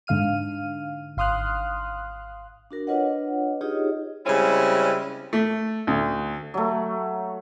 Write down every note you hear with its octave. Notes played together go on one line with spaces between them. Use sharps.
G#2 D3 F5 F6 D#7
G#1 F5 C6 D#6 F6 F#6
D4 F#4 A#4
D4 F4 B4 C#5 D#5 F#5
D#4 F4 G4 G#4 C#5 D#5
C#3 G3 G#3 C4 C#4 E4
A3
D2
F#3 A3